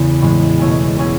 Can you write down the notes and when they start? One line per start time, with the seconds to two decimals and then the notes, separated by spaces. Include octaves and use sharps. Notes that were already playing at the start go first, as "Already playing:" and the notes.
Already playing: E2 C#3 B3
0.21 A2 E3 G#3
0.59 B2 A3 C#4 E4 G#4
0.96 B2 A3 C#4 E4 G#4